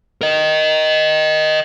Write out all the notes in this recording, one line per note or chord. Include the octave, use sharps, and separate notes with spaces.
A#4 D#5